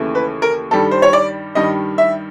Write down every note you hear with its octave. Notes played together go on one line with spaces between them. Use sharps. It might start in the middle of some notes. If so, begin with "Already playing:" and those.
Already playing: D#2 C#3 E3 A3
B4
A#4
G2 D#3 G3 A4
C5
C#5
D5
G2 D#3 G3 D#5
E5